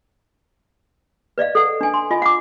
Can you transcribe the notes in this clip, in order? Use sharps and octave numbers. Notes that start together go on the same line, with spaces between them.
B4 D5 D#5 F5
A4 F#5
D4 G#5
C6
F4 D#5 G#5
F#5 D6